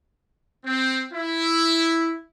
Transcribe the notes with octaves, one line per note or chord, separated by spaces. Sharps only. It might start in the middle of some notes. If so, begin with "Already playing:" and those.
C4
E4